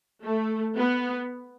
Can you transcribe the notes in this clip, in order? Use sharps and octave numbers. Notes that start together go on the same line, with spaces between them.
A3
B3